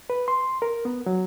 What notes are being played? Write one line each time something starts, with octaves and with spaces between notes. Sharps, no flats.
B4
C6
A#4
B3
F#3